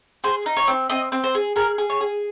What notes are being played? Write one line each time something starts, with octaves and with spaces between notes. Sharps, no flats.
G#4 C5
D#4
C#5
C4
C4 D#5
C4
C5
G#4
G#4 A#4
G#4
C#5
G#4